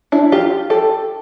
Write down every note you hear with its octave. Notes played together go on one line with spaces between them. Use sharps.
D4 E4
F4 G4
G4 A4